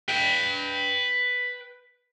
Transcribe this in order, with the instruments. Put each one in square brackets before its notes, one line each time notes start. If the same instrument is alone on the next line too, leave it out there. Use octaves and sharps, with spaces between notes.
[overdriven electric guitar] B4 G5